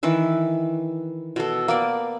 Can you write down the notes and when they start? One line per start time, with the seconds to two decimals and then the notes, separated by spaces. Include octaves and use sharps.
0.03 D#3 E3 B4 E5
1.36 B2 A4
1.68 A#3 B3 D5